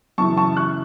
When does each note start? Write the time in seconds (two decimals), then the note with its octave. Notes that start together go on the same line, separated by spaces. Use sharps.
0.18 F#2 C#3 E3 A5 C#6
0.37 A5 C#6
0.57 C#6 F#6